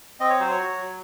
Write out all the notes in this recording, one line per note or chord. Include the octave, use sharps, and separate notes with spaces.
C4 D#5
C#5
F#3 C5
C#5
F#4
F#3